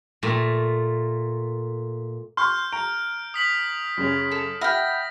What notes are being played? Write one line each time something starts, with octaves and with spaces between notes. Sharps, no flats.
A#2 A3
C6 C#6 F6 G6
A#5 D7
D#6 B6 F#7
F#2 C#3 C#4
A4
E5 F#5 G5 B5 F6 A#6